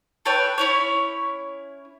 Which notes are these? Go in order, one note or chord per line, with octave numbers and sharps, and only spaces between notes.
A4 B4 C#5 G5
C#4 E4 C#5